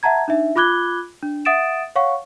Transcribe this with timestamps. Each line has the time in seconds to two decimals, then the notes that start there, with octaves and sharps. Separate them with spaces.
0.03 E5 F#5 A5 A#5 G#6
0.28 D4 D#4 E5
0.56 F4 B5 D6 F#6 G#6 G7
1.22 D4
1.45 E5 F#5 D#6 A6 D7 E7
1.96 C#5 F5 F#5 C#6